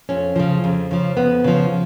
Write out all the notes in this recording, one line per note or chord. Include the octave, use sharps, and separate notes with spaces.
F2 C#4
C#3 F3
F2
C#3 F3
F2 B3
C#3 F3